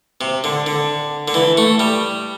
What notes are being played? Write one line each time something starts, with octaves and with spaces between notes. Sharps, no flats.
C3
D3
D3
D3
E3
A3
G3